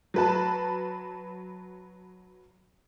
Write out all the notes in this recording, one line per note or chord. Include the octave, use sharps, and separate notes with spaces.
F#3 B4 A5